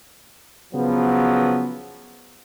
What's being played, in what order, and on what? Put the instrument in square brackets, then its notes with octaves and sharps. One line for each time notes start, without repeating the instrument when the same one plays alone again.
[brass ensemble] C#3 F3 F#3 B3